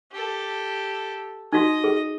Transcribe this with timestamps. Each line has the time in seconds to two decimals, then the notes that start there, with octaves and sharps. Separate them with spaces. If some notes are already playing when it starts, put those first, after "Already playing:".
0.12 G4 A4
1.53 D#4 F#4 D#5
1.84 G#4